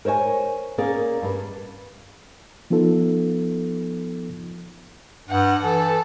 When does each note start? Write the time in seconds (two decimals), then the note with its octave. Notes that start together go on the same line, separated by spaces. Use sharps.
0.05 A#4 C5 C#5 D#5 G#5
0.78 A#3 C#4 G#4 A#4 D5
1.22 G2 G3
2.70 F3 B3 D#4 F4 A4
5.29 G2 F#5
5.63 E3 A4